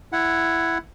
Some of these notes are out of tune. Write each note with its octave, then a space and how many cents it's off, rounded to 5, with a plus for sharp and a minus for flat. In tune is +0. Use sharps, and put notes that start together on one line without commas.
E4 +10 F#5 +0